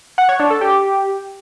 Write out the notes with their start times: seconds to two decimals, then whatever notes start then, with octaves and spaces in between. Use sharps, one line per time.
0.18 F#5
0.29 C#5
0.40 D4
0.50 A4
0.61 G4